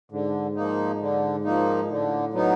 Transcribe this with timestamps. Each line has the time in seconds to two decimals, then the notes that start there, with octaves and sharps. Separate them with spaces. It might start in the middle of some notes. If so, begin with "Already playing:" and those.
0.12 G#2 D3
0.56 F3 A#3 D#4
1.01 D3
1.44 F3 A#3 D#4
1.89 A2 D3
2.34 F#3 B3 D#4